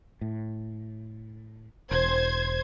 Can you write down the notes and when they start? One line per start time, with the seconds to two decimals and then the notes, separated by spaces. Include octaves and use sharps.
0.21 A2
1.91 E1 C5 G#6